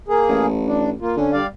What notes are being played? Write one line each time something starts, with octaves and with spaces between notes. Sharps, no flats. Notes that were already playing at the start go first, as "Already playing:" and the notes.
A#3 G#4
A1
D4
A#3 F4
D3 C#4
G3 D5 F5